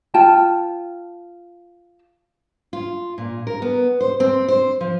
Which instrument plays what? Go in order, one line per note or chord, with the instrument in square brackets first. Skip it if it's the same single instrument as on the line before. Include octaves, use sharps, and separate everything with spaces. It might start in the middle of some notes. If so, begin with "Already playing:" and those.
[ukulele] F4 G5 A5
[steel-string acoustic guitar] F4
A#2
A#4
B3
C5
C4
C5
F3